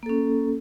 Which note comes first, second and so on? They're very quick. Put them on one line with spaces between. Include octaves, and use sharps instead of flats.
A#3 A4 C#4